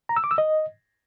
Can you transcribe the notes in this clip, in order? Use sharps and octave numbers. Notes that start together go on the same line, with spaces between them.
A#5
E6
D6
E6
D#5